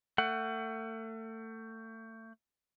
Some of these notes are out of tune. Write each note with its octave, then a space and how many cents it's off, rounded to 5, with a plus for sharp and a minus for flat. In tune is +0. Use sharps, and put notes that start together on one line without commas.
A3 +30 F#5 +20